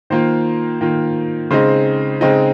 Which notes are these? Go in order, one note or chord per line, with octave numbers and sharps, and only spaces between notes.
D#3 A#3 F4 C5
D#3 A#3 F4
C#3 G#3 C4 D#4 C5
C#3 G#3 C4 D#4